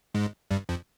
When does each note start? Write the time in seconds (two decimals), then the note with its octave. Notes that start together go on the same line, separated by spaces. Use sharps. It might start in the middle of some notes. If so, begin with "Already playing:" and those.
0.15 G#2 G#3
0.51 G2 G3
0.69 F2 F3